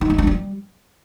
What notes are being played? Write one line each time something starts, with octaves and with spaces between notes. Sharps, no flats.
D#4
G#3
D4
G3